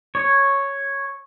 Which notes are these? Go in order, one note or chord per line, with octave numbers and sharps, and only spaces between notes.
C#5